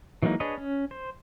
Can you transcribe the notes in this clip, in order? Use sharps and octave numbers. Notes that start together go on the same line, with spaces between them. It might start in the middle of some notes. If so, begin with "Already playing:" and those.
E3 F#3 G#3 A#3 D#4
D4 G#4 B4 C#5 D#5
C#4
C5